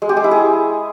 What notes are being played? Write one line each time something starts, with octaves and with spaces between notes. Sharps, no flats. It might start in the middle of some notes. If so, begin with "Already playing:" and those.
G#3
G4
G#3
E4
G#4